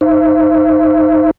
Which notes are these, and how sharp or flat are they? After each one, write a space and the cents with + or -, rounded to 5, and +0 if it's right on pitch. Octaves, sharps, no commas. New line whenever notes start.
D#4 +0 C5 +0 E5 +30